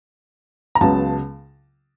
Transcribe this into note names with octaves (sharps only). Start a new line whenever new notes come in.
A#5
C#2 C#3 F#3 B3 A5